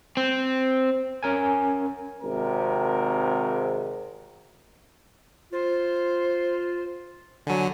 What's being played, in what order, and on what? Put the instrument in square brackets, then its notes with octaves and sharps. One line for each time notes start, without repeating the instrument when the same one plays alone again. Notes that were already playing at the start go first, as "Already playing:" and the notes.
[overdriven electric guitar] C4
[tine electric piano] C#4 A#4 G#5
[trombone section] G#1 C3 A#4
[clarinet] F4 [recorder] C5
[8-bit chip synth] D3 F#3 [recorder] G#5